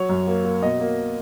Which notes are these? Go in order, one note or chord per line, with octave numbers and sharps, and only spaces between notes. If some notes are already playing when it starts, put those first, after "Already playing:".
Already playing: F#3 C#5
F#2
A#3
A#3
B2 D#5
A#3